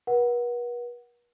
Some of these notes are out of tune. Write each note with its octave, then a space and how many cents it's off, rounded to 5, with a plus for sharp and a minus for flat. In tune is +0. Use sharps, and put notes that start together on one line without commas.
B4 -45 F#5 +0